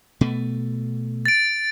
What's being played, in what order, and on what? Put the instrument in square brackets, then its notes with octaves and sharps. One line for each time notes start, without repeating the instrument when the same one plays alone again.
[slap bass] B2 A3
[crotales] A6 D7